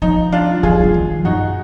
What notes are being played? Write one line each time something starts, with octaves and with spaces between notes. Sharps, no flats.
F3 D#4
D4 F4
F3 F4 G#4
F3
D#3
F#2 D#4 F#4